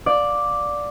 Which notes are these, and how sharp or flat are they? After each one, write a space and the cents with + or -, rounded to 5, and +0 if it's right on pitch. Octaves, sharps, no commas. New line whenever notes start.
D5 +0 F5 +30